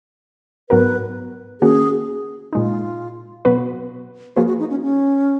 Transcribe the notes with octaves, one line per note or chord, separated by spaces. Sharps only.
G#2 F#3 B3 F#4 A#4 B4
D#3 A#3 C#4 F#4 G#4
A#2 G#3 D#4 F4
B2 F#3 B3 F#4 B4
F3 A#3 F4 F#4 G#4 B4
F#4
D#4
C#4
C#4